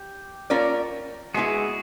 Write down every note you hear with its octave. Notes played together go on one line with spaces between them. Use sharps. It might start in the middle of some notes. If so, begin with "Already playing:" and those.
Already playing: G4
A#3 C#4 F4 A#4 D5
G#3 B3 E4 F#4 G#4